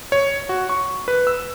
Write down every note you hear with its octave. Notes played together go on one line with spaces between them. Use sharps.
C#5
F#4
C#6
B4
E6